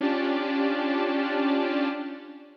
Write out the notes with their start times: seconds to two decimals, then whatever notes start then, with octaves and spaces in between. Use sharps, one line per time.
0.01 C#4 D4 F4 G4 D5 A5